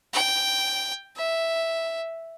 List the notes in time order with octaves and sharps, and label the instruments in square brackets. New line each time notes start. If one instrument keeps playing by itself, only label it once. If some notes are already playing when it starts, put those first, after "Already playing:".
[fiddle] G5
E5